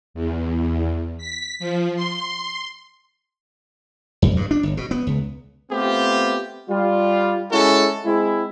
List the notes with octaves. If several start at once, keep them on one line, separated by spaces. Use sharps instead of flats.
E2
B6
F3
C6
F2
G2
D4
G1
B2
B3
C#2
A3 B3 C4 F4 G4
G3 F4
G#3 C#4 E4 F#4 A4
G#3 C4 E4